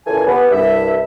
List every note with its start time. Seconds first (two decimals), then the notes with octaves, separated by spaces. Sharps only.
0.07 A#2 C#3 E3 A4 G#5
0.27 B3 G4
0.51 C2 G2 E5